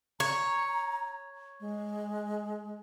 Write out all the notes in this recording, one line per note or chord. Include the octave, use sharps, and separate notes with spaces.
C#5 A#5
G#3